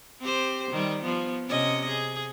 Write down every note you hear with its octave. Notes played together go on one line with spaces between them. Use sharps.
C4 G4 C5
D#3 G3
F3 B3
C3 C#4 D#5
G#4